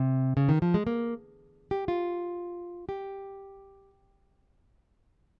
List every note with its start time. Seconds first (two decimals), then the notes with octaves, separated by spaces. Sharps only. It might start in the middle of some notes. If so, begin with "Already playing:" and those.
Already playing: C3
0.37 C#3
0.49 D#3
0.62 F3
0.74 G#3
0.87 A#3
1.71 G4
1.88 F4
2.89 G4